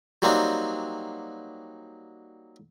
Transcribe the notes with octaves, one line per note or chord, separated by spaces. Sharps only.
F#3 G3 A#3 C4 D4 D#4